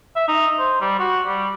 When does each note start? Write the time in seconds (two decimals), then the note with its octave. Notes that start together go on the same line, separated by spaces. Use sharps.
0.16 E5
0.28 D#4
0.59 C5
0.81 G3
0.99 F#4
1.26 G3